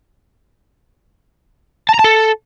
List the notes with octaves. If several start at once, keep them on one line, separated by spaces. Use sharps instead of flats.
A5
A#5
A5
A4